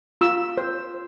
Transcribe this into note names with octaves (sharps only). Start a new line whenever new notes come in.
F4 E6
C5